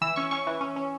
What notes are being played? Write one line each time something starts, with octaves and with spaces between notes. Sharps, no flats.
E3 E6
C#4 C#6
C#4 C#6
E3
C#4
C#4